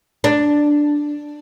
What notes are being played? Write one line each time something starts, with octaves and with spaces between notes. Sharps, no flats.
D4